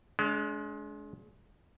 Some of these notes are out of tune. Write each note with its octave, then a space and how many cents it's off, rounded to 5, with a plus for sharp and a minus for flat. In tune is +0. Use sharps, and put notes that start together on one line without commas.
G#3 +30 D4 -30